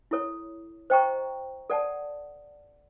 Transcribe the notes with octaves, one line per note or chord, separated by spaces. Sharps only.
E4 A4 C#5
C5 D#5 G5 A#5 C#6
A4 D5 F#5 A5